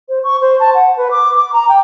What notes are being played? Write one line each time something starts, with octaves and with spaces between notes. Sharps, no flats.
C5
C#6
C5
A5
F#5
B4
D6
D6
A#5
G5